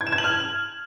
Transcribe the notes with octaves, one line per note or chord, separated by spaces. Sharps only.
G#6
E7
G#6
F#7
F6